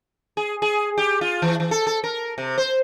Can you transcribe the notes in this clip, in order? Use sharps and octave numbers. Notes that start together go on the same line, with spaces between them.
G#4
G#4
G4
F4
E3
E3
A4
A4
A#4
C3
C5